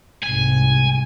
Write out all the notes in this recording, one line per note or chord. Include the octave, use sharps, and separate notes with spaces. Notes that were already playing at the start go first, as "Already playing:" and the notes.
C2 G#2 C3 G#5